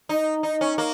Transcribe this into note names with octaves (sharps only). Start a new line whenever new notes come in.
D#4
D#4
C#4
A#3